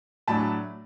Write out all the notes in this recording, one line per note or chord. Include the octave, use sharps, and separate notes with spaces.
A2 F#3 A3 D4 A5 B5